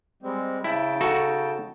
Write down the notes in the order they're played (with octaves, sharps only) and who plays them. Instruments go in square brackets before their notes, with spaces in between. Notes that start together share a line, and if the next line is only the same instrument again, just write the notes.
[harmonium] G3 G#3 C4
[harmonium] C#3 G5 A5 [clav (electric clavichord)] E4
[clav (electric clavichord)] D#4 F#4 A4